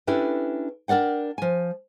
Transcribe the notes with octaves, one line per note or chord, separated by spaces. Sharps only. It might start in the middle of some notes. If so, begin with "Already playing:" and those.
C#4 D4 E4 G4 A4 B4
D4 A#4 D5 F#5 G5
F3 G#5